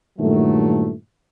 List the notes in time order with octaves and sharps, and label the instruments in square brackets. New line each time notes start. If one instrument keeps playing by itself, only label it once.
[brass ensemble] G2 A#2 D#3 F#3 A3